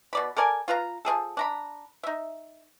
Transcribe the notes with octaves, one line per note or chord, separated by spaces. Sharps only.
B2 D5 B5
A4 A#4 D5 G#5
F4 B4 F5 A#5
F3 D4 G#4 A4
D4 A#5 B5
D#4 E5